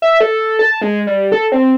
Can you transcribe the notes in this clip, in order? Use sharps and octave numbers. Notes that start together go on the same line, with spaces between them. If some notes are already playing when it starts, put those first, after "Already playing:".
E5
A4
A5
G#3
G3
A4
C4